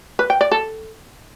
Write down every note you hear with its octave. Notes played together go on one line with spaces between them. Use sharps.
B4
G5
D5
A4